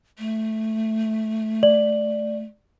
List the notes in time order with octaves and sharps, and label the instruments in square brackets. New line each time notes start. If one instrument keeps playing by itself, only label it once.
[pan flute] A3
[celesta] D5 F#7